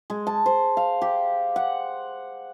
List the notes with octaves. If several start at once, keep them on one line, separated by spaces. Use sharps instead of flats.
G#3
A5
C5
F5
G4
F#5